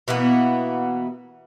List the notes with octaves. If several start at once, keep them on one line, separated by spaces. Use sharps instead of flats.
B2 E3 A#3 B3